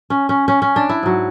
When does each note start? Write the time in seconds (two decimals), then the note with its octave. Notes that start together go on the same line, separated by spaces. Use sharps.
0.10 C#4
0.29 C#4
0.48 C#4
0.62 C#4
0.76 D4
0.89 E4
1.03 G#2 F#3